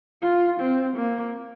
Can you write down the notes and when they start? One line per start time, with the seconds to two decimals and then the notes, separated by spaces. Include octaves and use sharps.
0.22 F4
0.60 C4
0.96 A#3